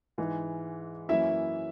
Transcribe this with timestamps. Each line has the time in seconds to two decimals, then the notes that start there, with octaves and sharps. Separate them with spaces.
0.18 G#2 E3 G#3
1.09 F#2 E3 A#3 C#4 E4 E5